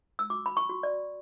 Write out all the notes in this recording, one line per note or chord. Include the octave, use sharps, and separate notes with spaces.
E6
F#4 D6
B5
C#6
F#4
D5